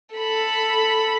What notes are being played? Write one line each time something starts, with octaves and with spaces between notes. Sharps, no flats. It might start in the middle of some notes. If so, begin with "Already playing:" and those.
A4 B5